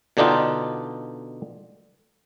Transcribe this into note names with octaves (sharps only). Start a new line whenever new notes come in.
B2 D3 D4 D#4 F4 G5